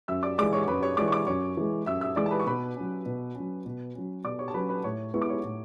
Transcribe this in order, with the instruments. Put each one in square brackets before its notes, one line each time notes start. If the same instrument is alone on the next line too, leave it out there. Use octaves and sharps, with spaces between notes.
[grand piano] F#2 [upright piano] E5 E6
[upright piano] D5 D6
[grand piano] E3 G#3 [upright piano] D5 D6
[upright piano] C#5 C#6
C#6
[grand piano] F#2 [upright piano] B4 B5
[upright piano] C#5 C#6
[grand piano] E3 G#3 [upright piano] D5 D6
[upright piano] C#6
D5 D6
[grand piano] F#2 [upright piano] C#5 C#6
[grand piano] E3 G#3
[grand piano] F#2 [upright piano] E5 E6
[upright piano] E5 E6
[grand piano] E3 G#3 [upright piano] D5 D6
[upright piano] A5
B4 B5
C#6
[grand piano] B2 [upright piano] B4 B5
[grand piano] F#3 C#4
B2
F#3 C#4
B2
F#3 C#4
[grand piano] B2 [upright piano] D5 D6
[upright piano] C#5 C#6
A5
[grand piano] F#3 C#4 [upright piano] B4 B5
[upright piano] B4 B5
[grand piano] A2 [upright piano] C#5 C#6
[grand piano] G#3 B3 E4 B4 [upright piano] C#6
[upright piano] D6
C#5 C#6
[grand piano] A2